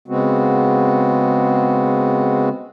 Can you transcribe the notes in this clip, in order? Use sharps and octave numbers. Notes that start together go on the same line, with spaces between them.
C#3 G#3 B3 C4 F#4